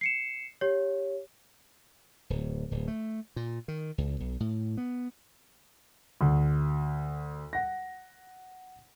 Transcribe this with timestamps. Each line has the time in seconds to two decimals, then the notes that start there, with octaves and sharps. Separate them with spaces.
0.01 C7 C#7 E7
0.61 G4 C#5
2.30 D1
2.71 D1
2.88 A3
3.36 A#2
3.68 D#3
3.98 C#2
4.20 B1
4.40 A2
4.77 B3
6.21 D2
7.53 F#5 A#6